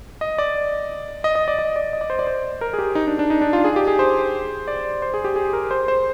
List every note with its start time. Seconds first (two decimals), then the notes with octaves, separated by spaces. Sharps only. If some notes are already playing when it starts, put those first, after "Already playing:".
0.21 D#5
0.38 D5
1.24 D#5
1.35 D#5
1.48 D5
1.58 D#5
1.76 D5
1.93 D#5
2.01 D5
2.10 C5
2.19 D5
2.27 C5
2.61 A#4
2.73 G#4
2.79 G4
2.95 D#4
3.07 D4
3.19 D4
3.30 D#4
3.41 D4
3.53 F4
3.64 G#4
3.76 G4
3.88 G#4
3.99 C5
4.68 D5
5.02 C5
5.14 G#4
5.24 G4
5.36 G#4
5.53 A#4
5.71 C5
5.88 C5